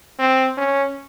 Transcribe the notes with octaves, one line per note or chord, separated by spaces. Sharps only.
C4
C#4